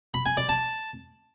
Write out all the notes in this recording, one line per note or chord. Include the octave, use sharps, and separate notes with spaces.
B5
G#5
D5
A5